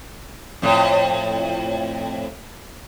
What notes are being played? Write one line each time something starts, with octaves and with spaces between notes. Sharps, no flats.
F2 A2